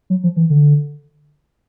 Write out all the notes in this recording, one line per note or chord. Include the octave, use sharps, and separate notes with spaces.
F#3
F3
E3
D3